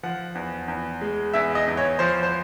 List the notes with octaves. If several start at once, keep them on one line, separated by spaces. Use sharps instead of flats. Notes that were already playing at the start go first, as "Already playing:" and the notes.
F3 F#5
E2
E2
G#3
E2 E5
D#5
E2
C#5
F3 C5
C5